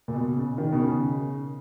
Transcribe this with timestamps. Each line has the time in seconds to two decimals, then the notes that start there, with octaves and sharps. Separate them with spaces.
0.08 A#2
0.14 B2
0.36 C#3
0.58 D#3
0.72 B2
0.80 C#3